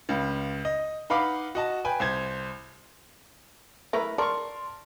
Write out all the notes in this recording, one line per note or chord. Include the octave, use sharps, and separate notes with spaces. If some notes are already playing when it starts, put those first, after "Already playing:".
C#2 C#3
D#5
D#4 B4 F5 F#5 B5 D6
F#4 D#5 A5
B4 G5 G#5
C2 C5 G#6
E3 A3 A#4 B4 A#5
A#4 D5 A5 C6 C#6